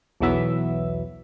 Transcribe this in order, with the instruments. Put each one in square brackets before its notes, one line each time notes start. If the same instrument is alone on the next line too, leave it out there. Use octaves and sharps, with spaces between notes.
[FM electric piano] B1 E2 E3 F#3 B3 E5